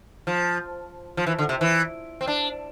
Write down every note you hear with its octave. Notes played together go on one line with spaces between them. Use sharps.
F3
F3
E3
D3
C3
E3
C4
D4